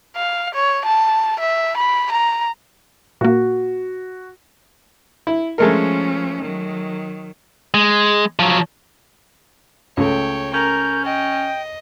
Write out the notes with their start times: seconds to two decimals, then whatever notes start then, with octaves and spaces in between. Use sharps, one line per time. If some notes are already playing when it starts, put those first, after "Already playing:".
0.16 F5
0.54 C#5
0.85 A5
1.40 E5
1.77 B5
2.12 A#5
3.21 A#2 A#3 F#4
5.27 E4
5.58 F3 G#3 A3 C#4 A#4
6.41 D#3 F#3
7.74 G#3
8.39 F3 F#3
9.97 C#2 A3 C#5 G5
10.54 C#4 A#4 G6
11.05 D#5 G5